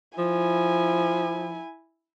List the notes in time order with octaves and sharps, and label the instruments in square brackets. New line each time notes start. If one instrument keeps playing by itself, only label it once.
[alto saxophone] F3 [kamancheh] E4 G#5